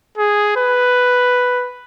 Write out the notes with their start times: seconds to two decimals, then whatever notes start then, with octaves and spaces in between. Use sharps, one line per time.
0.18 G#4
0.57 B4